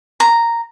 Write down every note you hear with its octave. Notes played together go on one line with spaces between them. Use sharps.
A#5